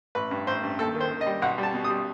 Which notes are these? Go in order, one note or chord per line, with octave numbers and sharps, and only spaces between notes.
A1 B4
G2
A1 C5
G2
D#2 A4
D#3
C5
D#3
D#5
G3
B1 F#5
G3
A5
B2
D#6
G3